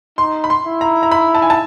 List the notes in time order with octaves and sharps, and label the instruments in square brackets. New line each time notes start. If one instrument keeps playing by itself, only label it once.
[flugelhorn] D#4 [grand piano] C6
[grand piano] B5
C6
[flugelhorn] E4
[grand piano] A#5
A#5
B5
A5
G#5
A5